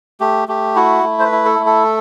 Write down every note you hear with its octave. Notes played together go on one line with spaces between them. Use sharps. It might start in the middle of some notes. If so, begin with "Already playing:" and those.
A3 G4
A3 G4
E4 F#4
A3
C5
B4
E4
A4
A3
A4